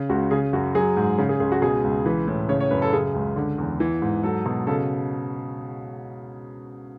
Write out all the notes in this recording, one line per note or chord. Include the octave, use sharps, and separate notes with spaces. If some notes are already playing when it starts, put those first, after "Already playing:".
Already playing: C#3
C#2 F#4
C#3 G#4
F#2 F#4
F#3 G#4
G#2
C#3
G#4
C#2 G#4
F#4
B2 G#4
C#2
E3 B4
A2
C#3 C#5
C#5
F#2 B4
A4
C#3 G#4
C#2
D3
E2
E3
G#2
F#3 A4
B2
C#3 A4